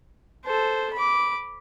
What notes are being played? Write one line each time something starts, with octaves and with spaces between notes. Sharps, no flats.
A4 C5
B5 D6